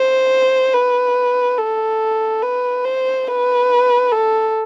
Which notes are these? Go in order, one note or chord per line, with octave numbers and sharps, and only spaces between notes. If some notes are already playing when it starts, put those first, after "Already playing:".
Already playing: C5
B4
A4
B4
C5
B4
A4